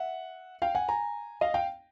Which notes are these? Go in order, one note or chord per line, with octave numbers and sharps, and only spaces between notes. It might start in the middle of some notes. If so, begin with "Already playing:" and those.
Already playing: E5 F#5
F5 G5
F#5 G#5
G#5 A#5
D#5 F5
F5 G5